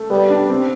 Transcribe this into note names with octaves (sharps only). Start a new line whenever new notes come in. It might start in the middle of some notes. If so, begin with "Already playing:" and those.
Already playing: A3
G3 B3
D4
C4